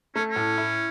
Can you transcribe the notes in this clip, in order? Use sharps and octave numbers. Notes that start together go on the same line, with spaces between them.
A3 C#4
C#4
A2
E4